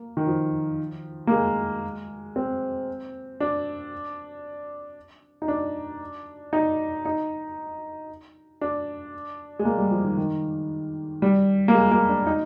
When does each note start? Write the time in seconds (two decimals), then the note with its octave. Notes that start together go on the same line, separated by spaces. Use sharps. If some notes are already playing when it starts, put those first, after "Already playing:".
Already playing: A#3
0.17 D#3
0.27 F3
1.27 A#3
1.32 G#3
2.36 C4
3.40 D4
5.42 D#4
5.48 D4
6.53 D#4
7.05 D#4
8.61 D4
9.59 G#3
9.65 A#3
9.78 G3
9.91 F3
10.04 D#3
10.17 D#3
11.22 G3
11.68 A#3
11.74 G#3
11.91 A#3
12.09 D4
12.27 D#4